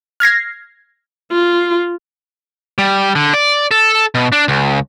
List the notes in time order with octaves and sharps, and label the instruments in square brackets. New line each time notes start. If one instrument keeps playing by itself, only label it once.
[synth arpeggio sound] F6 G#6 A#6 C7
[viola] F4
[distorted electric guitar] G3
D3
D5
A4
B2
D4
C#2